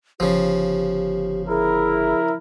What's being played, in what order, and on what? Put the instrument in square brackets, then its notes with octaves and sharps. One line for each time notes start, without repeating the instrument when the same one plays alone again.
[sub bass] G1 [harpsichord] C#3 F3 [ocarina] G4
[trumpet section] E4 A#4 [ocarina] G#4